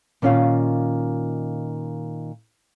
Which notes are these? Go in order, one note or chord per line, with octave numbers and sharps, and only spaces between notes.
A#2 D#3 C#4 F4 F5